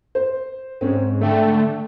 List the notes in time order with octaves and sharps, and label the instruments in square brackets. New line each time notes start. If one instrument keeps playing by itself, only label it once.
[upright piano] C5
[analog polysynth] G#2 [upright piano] C4 C#4
[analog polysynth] D3 [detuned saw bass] A3 [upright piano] A4 E5 G5